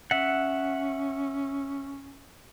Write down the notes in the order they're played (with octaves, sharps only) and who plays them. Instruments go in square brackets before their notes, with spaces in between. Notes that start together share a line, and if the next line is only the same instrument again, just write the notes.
[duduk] C#4 [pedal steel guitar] E5 F#5